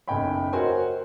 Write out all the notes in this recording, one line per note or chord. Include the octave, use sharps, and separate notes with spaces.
F#1 B1 D#5 G5 G#5 B5
F#4 A#4 C5 C#5 D#5 G#5